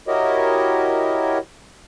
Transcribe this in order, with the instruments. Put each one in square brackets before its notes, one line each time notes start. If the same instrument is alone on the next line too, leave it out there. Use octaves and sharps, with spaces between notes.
[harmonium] E4 F#4 G4 A#4 C#5 D#5